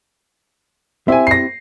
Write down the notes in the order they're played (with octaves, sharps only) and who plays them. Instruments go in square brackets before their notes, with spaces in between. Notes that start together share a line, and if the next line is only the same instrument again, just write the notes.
[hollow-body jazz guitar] C4 E4 G4 [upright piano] E5 G#5
[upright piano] A#6 C7